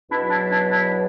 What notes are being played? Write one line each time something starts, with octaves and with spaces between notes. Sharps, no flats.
E2 B2 F#3 D4 E4
D4 E4
D4 E4
D4 E4